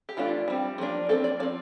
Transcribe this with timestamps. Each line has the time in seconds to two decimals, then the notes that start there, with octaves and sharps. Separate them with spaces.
0.09 G4
0.17 E3 A3 D4 F4
0.48 G3 C4
0.78 F3 A#3 D4
1.09 F3 C4 A4
1.24 D5
1.40 F3 D5
1.43 C4